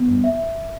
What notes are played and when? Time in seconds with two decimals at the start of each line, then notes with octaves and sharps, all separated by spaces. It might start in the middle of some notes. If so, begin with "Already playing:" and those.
Already playing: B3
0.08 G2
0.24 E5